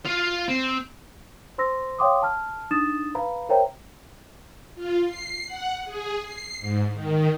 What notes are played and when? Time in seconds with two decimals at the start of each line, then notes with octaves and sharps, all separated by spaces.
0.05 F4 F5
0.49 C4
1.58 C5 C6 E6 A#6
1.99 C#5 F5 G5 C6 D6 D#6
2.22 A5 F6
2.71 D4 D#4 D#6 A6 E7
3.15 B4 F5 A#5 B5
3.49 A#4 C5 C#5 E5 G5 A#5
4.75 F4
5.04 C7
5.46 F#5
5.85 G#4
6.22 C7
6.59 G#2
6.93 D#3